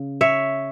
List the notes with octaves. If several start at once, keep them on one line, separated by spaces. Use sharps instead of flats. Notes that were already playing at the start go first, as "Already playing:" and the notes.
Already playing: C#3
C#5 E5